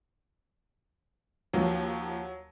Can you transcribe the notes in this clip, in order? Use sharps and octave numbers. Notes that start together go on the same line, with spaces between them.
D#2 F3 F#3